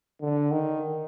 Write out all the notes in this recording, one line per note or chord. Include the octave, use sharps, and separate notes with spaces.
D3
D#3